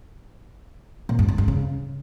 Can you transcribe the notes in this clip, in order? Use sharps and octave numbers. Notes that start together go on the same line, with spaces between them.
A#2
G2
D#3
G2
C#3